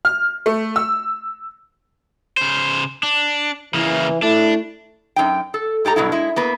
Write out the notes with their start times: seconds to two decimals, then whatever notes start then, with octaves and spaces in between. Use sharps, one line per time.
0.05 F6
0.46 A3
0.76 E6
2.37 C#3 C5
3.03 D4
3.74 C#3 E3 A#3
4.22 A3 D4 E4
5.16 F#2 D#4 G5
5.54 A4
5.85 G#2 G4 A4 A#5
5.96 G2 B2 F#3 E4
6.12 G#3 E4
6.36 A#3 B3 B4